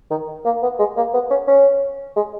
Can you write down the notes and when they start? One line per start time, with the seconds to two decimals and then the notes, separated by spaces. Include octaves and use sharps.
0.11 D#3
0.45 A#3
0.62 B3
0.79 G#3
0.97 A#3
1.14 B3
1.30 C#4
1.47 C#4
2.16 G#3